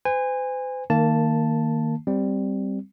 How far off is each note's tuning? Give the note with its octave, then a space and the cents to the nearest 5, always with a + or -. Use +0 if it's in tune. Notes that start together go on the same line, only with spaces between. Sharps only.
C5 -45 G#5 -25
D#3 +0 A#3 -20 A5 +0
G3 +0 C4 +0